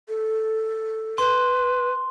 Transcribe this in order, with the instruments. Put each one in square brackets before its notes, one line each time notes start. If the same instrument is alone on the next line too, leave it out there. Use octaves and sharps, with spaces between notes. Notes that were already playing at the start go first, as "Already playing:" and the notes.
[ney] A4
[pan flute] B4 [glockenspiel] C6